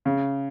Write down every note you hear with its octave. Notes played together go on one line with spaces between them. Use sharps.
C#3